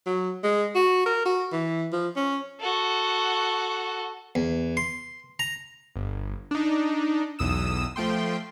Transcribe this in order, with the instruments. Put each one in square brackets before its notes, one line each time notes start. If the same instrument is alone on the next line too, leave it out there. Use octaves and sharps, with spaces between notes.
[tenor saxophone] F#3
G#3
F#4
A#4
F#4
E3
F3
C#4
[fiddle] F#4 A4
[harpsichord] E2
C6
A#5
[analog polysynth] G1
D4 D#4
B1 E2 D#6 E6 E7
F3 A3 G5 C6